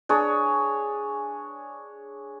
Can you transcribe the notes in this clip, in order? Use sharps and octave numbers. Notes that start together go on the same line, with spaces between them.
D4 G#4 C#5